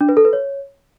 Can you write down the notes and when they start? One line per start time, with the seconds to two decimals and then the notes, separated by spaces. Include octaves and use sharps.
0.01 D4
0.09 B4
0.17 A4
0.25 B4
0.33 C#5